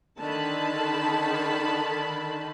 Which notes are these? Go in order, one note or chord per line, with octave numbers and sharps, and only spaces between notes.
D3 D#3 A5 B5